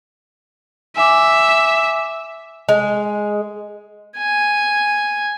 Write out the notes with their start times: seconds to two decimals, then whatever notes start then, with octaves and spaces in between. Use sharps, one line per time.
0.97 E5 G#5 D6
2.69 G#3
4.18 G#5